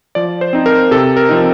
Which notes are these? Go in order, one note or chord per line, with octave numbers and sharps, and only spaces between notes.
F3 D5
C5
C4 D#4
A#4
C3 A4
A#4
F3 C4 D#4